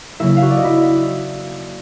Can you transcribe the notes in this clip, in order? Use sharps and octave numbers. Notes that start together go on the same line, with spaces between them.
C#3 F#3 A#3 E4 E5
F5
F#4 F#5
D5
D#5
E4 E5